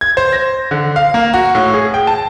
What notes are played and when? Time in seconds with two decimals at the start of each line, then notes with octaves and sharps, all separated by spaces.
0.01 G#6
0.17 C5
0.33 A#6
0.71 D3
0.96 F5
1.14 A#3
1.33 F#4
1.55 A2
1.74 G#4
1.94 G5
2.07 A5